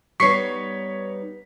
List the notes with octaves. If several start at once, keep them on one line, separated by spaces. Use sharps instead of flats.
G3 B3 D#4 C#5 C#6 B6 C7